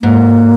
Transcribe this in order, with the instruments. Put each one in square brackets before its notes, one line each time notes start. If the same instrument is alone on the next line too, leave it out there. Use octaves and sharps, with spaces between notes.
[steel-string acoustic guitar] G#2 [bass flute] A#3